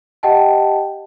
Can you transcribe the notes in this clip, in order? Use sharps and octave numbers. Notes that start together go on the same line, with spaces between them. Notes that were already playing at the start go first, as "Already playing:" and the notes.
G4 D#5 F#5 G5 A5